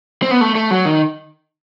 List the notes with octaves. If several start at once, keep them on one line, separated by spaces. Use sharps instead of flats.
C4
B3
A3
A3
F#3
D#3